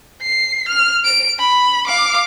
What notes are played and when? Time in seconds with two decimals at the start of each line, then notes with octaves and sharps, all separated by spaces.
0.22 C7
0.68 F6
1.04 D7
1.39 B5
1.87 F5 D6